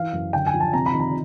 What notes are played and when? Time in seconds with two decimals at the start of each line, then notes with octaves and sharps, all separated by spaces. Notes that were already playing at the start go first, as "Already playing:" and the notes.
Already playing: E3 F5
0.13 F#2
0.33 D3 G5
0.46 G#5
0.54 F3
0.60 A5
0.73 C3 A#5
0.86 B5
0.93 D#3
1.00 A#5